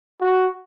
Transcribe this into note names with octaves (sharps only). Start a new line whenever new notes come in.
F#4